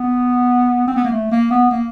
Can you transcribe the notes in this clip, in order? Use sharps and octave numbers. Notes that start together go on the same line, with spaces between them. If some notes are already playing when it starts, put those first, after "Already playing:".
Already playing: B3
C4
B3
A#3
A3
A#3
B3
A#3